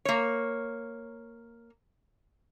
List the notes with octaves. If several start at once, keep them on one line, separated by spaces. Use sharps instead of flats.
A#3 C#5